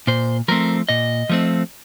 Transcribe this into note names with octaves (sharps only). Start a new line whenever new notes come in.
A#2 C5
F3 A3 C4 A#4
A#2 D#5
F3 A3 C4